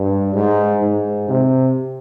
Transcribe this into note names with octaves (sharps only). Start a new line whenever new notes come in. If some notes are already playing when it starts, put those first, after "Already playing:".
Already playing: G2
G#2
G#2
C3